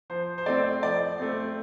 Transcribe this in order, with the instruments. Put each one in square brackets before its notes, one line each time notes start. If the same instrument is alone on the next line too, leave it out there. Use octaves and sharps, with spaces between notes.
[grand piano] F3 C5
C5
A3 C4 D5
F3 D5
A3 C4